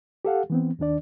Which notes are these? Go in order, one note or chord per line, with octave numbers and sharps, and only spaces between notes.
G4 A4 F5 F#5
E3 B3 C4
D#2 D#3 D4 D5